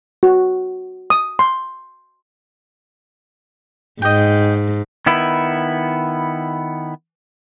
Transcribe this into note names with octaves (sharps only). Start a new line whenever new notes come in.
F#4
D#6
C6
G#2 D#5 G5
D#3 B3 E4